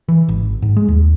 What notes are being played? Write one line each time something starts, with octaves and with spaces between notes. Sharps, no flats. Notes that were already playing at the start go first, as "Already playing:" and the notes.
E3
G#1
G#2
G#3
D#2